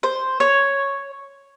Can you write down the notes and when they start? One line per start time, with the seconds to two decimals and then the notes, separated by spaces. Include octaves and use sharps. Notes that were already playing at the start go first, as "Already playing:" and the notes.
0.03 C5
0.40 C#5